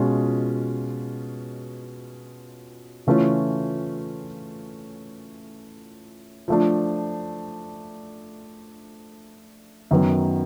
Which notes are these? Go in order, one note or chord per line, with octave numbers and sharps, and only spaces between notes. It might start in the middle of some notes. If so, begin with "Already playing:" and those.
Already playing: B2 G#3 C#4 F4
C#3 E3 A3 C#4 F4
F3 A3 D4
F#2 D#3 F#3 B3